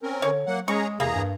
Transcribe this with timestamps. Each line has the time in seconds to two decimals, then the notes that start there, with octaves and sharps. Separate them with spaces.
0.03 C4 C#4 A#4
0.22 D3 C#5
0.47 F#3 A#3 F#5
0.68 G#3 C#4 G#4 A#5 C#6
1.00 E2 C3 A#3 G#4 A#5
1.14 G2